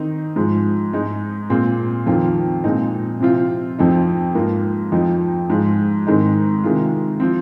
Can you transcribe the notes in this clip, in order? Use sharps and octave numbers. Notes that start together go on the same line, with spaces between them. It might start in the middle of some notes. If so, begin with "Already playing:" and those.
Already playing: D#3 C4 D#4
G#2 F3 G#3
G#2 G#3 D#4
A#2 G#3 C4
F2 D#3 C4 F4
A#2 G#3 C4 D#4
C3 F3 C4 F4
F2 F3 C4 D#4
G#2 F3 A#3
F2 F3 C4 D#4
G#2 F3 G#3 F4
G#2 D#3 G#3 C4 D#4
C3 D#3 G#3 F4
F3 C4